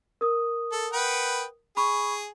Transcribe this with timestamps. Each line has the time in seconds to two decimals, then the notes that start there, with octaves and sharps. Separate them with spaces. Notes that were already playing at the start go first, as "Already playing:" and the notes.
0.21 A#4 D#6
0.72 A4
0.93 B4 F#5 G5
1.77 G#4 B5 C#6